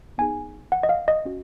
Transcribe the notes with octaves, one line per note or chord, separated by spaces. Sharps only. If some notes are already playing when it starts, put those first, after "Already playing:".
B3 D#4 G#4 G#5
F#5
D#5
F5
D#5
C#4 F#4